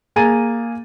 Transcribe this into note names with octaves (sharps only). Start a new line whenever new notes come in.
A#3 G#4 G#5 A#5 A6 D#7